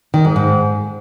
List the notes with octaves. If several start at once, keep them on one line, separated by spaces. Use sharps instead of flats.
D#3
G#2
G#2